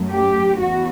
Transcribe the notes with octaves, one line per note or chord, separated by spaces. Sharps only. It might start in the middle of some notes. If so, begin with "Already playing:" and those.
Already playing: F#2 F#3 A3
G4
E2 F#4